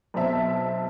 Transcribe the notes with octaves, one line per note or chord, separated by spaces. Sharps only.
B1 B2 C4 E5 A5